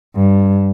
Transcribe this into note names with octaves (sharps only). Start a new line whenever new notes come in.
G2